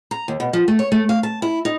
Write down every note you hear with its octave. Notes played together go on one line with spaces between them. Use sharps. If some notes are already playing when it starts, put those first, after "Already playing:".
A#5
D#2
B2
F3
A3
C#5
A3
F5
A5
E4
D#4